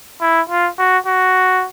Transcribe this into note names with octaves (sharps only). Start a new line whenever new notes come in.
E4
F4
F#4
F#4